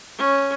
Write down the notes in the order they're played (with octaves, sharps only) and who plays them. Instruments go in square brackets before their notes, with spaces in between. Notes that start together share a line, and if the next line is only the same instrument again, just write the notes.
[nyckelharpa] C#4